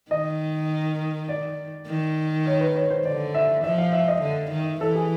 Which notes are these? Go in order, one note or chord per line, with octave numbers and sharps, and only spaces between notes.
D#3 D#5
D5
D#3
C#5
B4
C#5
C5
D3 D5
E5
F3 E5
F5
E5
D#5
D3
D#3
E3 A4
G#4